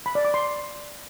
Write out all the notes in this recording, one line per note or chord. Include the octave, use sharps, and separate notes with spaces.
B5
D5
D6
C6